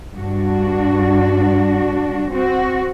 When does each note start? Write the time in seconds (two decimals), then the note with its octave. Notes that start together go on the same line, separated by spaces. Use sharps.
0.15 G2 D4 F#4
2.30 C4 F#4